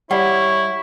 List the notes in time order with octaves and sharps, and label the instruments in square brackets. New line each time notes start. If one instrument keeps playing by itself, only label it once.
[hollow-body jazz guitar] G3 [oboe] E4 [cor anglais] C#5 [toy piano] D5 F#5